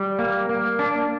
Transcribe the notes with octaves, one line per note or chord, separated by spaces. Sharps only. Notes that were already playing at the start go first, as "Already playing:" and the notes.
Already playing: G3
A#3
A#3
D4